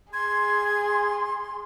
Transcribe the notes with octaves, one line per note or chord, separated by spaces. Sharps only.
G#4 C6 G#6